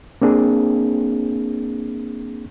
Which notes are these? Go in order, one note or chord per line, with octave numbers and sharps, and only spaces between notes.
A#3 C4 D4 G#4